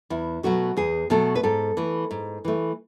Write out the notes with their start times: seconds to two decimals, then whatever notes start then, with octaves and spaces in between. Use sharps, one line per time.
0.10 E2 E4
0.43 B2 F#3 A3 F#4
0.77 E2 G#4
1.10 B2 F#3 A3 A4
1.35 B4
1.43 G#2 A4
1.77 E3 A3
2.11 G#2
2.45 E3 A3